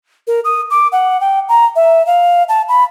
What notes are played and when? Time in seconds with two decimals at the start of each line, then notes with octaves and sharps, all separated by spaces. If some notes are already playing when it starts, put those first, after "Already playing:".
0.27 A#4
0.44 D#6
0.70 D6
0.92 F#5
1.20 G5
1.49 A#5
1.76 E5
2.07 F5
2.49 A5
2.68 B5